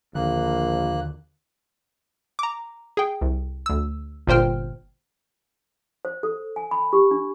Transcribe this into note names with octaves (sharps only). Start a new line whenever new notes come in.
A#1 D#2 D3 D#3 A#3 F#6
A#5 D6
G#4 G5
C2
D2 E6
G1 A#2 C5 G5 F6
C5
A4
G#5
B5
G4
D4